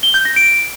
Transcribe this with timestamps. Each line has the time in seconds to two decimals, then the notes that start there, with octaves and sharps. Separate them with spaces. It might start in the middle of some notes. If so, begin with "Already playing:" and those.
0.03 G7
0.14 G6
0.25 A#6
0.36 D7